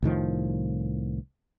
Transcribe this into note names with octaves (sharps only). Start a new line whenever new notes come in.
C2 A2 D#3 F3